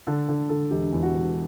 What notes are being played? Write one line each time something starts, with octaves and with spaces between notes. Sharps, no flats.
D3 A4
D3
D3 A4
E1 G4
E2
F#4
E1